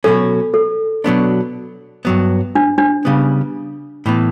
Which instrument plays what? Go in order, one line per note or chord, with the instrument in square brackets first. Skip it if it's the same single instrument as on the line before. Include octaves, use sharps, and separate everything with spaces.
[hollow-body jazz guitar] B2 F#3 C#4 [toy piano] A4
[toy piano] A4
[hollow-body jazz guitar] B2 F#3 B3 D4
G2 F#3 B3
[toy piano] D4
D4
[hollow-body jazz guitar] C#3 G3 B3
A2 E3 B3